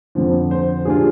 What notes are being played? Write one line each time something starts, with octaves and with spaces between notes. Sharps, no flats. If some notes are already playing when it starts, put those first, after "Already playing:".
F2 D3 F3
C5
A#2 G3 D4 F4 G#4